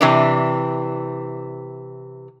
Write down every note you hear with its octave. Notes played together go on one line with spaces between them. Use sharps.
C3 E3 D4